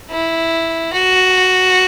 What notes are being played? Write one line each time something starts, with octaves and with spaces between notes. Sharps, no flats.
E4
F#4